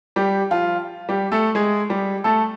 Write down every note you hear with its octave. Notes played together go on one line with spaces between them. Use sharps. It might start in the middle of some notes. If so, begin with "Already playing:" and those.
G3 G4
F3 F4
G3 G4
A3 A4
G#3 G#4
G3 G4
A3 A4